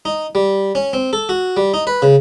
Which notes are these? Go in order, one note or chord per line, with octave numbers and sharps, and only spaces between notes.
D#4
G3
C#4
C4
A4
F#4
G3
D#4
B4
C#3